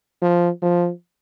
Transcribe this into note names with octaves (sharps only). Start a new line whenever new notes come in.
F3
F3